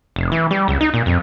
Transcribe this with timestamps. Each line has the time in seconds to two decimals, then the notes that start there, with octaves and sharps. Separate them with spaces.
0.16 F1
0.32 E3
0.51 G3
0.68 C#2
0.81 D#4
0.94 A#2
1.06 F2